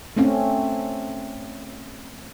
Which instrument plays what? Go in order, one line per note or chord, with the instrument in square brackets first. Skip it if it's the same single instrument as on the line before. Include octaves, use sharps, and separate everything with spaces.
[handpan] A3 C4 C#4